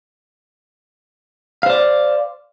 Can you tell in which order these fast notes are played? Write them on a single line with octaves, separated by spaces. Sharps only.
F5 C5 D5